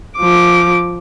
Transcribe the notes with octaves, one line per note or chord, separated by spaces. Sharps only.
F3 D6